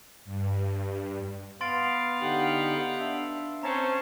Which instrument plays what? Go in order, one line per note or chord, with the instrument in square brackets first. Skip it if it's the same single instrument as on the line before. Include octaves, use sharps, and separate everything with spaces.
[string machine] G2
[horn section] B3 F5 [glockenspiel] C6 A6 D7
[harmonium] D3 D#4 G4 [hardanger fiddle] F#5 G5
[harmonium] D4 E5
[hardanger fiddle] C4 C5 [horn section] C#4 C#5 A5 [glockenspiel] A#5